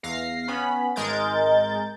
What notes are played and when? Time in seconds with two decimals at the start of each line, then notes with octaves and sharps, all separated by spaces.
0.03 E2 F5 A#6 C7
0.48 B3 C#4 B5
0.96 G#1 G#3 A#4 G6 A6